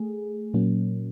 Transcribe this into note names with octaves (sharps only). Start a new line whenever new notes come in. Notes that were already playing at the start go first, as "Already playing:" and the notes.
Already playing: A3 G#4
A#2 F#3 A#3 C#4